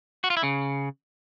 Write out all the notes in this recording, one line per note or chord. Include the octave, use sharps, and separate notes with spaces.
F#4
F4
E4
C#3